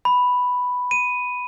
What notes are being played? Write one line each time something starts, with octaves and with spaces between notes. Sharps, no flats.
B5
D#7